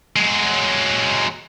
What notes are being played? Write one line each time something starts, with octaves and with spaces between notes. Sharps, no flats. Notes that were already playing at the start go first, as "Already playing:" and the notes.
F#3 G#3